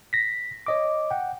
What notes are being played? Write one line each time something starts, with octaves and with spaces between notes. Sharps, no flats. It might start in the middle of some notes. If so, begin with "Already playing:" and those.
A#6 B6
C#5 D#5 D6
F#5 G5